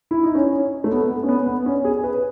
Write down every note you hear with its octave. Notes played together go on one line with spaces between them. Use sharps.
E4
D#4
C#4
A3
B3
B3
C#4
B3
B3
C#4
G#4
B4